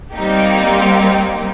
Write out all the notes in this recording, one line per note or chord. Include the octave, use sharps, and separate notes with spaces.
G3 A#3 C4 D#4 G4